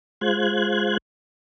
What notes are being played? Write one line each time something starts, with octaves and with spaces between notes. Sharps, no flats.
G#3 F4 C5 F#6 G#6